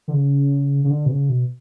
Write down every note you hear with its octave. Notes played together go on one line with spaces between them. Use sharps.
D3
C#3
C#3
D3
B2
C#3
B2